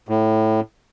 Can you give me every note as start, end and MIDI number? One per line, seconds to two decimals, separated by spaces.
0.09 0.60 45